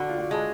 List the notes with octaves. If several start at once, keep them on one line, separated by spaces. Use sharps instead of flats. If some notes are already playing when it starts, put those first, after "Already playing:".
Already playing: D3 F#4
F4
F#4
G#3